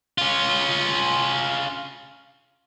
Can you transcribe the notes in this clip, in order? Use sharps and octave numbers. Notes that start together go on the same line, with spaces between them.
C#4 F4